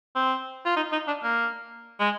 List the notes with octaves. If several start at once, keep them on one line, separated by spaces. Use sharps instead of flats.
C4
F4
D#4
D#4
D4
A#3
G#3